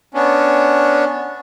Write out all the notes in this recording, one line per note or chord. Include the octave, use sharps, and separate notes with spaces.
B3 C#4 D4